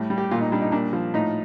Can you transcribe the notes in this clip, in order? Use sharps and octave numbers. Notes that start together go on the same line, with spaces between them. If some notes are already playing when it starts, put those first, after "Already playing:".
Already playing: A2 G3
G3
G4
A#2 F4
D#4
G3 D4
D#4
A#2 D4
F3
A2 D#4